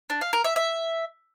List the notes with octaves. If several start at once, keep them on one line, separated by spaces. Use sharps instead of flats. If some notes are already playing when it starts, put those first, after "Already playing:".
D4
F5
A#4
E5
E5